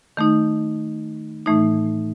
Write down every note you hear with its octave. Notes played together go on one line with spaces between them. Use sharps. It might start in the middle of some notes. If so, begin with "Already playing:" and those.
D#3 A3 D#4
A2 E3 A3 D#4